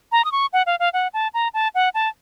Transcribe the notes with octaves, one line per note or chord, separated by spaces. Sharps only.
A#5
D#6
C#6
F#5
F5
F5
F#5
A5
A#5
A5
F#5
A5